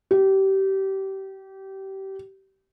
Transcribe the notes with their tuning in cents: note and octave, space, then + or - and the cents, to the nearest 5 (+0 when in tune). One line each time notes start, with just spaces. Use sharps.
G4 -25